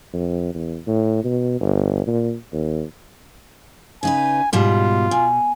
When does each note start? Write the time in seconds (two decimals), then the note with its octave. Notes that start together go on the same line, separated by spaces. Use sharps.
0.13 F2
0.55 E2
0.87 A2
1.24 B2
1.60 G1
2.07 A#2
2.53 D#2
4.03 C#3 D#4 B4 G#5
4.53 G#2 B2 G3 F4
5.11 B2 G#5